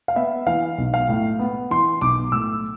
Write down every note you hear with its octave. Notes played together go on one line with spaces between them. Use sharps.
F5
B3 E5
E3 F5
B1
F5
A2
B3
E3 C6
B1 D6
A2 E6